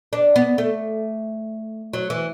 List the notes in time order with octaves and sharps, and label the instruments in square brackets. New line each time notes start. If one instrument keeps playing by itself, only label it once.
[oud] D4
B3
A3
F#3
E3